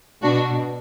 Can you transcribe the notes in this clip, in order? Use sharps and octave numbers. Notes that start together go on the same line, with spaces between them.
B2 D4 F#4